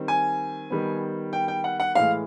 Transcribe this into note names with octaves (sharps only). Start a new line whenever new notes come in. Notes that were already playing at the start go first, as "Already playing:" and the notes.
Already playing: D#3 G3 C4
G#5
D#3 G3 B3
G5
G5
F#5
F#5
A2 E3 G#3 F5